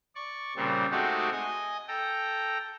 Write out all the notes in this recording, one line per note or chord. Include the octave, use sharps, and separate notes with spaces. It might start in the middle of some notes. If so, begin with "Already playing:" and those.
D5 C#6
A#2 C#3 G3 C4
G#3 A3 C4 D#4 F#4 G4
D#5 G#5
A4 G5 A#5